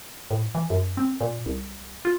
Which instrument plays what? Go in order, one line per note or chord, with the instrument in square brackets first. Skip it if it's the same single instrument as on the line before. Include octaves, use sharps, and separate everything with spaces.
[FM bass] A2
E3
F#2
C4
A#2
C2
F4